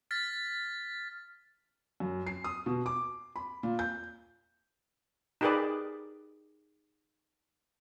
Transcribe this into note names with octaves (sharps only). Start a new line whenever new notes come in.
F6 A6 B6
F#2
C7
D#6
B2
D6
B5
A#2
G6
D#4 G4 G#4 A#4 B4 D5